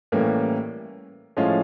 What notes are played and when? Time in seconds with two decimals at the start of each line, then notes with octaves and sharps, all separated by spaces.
0.12 A2 E3 G3 A#3 C#4
1.37 A2 F3 G#3 C#4 F4